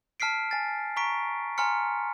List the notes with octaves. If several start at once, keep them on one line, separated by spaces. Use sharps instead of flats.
A5 F6 B6 C7 D7
G#5 A6
A#5 C#6 B6 D7
G#5 A#5 C6 F6 C#7